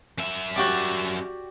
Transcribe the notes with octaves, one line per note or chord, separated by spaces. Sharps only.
F#2 E5
F#4 G4 D5